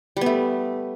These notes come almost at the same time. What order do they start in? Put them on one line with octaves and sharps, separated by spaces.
G3 B3 A3